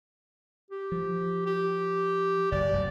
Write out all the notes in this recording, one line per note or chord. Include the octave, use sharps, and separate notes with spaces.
G4
F3
G4
F#1 D5
F1 F#3